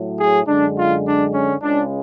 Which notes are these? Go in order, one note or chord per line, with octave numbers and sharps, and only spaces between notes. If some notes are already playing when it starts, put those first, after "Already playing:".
Already playing: A2 F#3
G#4
F#2 D3 G#3 D4
F4
D4
C#4
C#2 C#3 G#3 D4